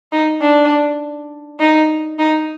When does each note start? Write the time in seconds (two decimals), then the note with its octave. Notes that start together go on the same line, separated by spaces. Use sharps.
0.12 D#4
0.41 D4
1.60 D#4
2.19 D#4